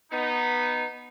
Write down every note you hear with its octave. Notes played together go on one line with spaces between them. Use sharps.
B3 D#4